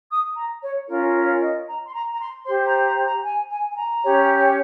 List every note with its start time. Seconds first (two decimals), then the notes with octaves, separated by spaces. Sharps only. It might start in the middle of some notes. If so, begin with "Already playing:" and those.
0.10 D#6
0.37 A#5
0.62 C#5
0.89 C#4 F4 A#4
1.15 C#5
1.41 D#5
1.67 A#5
1.86 C6
1.93 A#5
2.13 A#5
2.19 C6
2.45 G4 C5 C6
2.65 A#5
2.85 A#5
3.05 A#5
3.25 G#5
3.50 G#5
3.70 G#5
3.77 A#5
4.03 C#4 G4 C#5